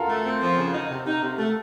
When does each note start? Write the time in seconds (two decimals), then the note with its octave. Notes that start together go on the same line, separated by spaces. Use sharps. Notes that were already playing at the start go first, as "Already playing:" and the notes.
Already playing: F4 F#4 A4 A#4 F5 A#5
0.09 A3
0.25 C4
0.42 F3
0.58 C#3
0.74 D#4
0.90 C3
1.06 D#4
1.22 C3
1.39 A3